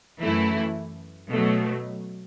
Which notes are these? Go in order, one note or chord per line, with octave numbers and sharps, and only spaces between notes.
F#2 E3 A3 E4
B2 F#3 A3